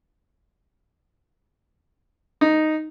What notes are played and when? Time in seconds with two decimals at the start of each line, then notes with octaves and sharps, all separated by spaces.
2.41 D#4